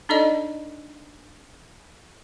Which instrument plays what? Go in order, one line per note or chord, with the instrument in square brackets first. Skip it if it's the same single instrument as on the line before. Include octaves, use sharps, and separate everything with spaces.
[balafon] D4 D#4 A4 D5 D#5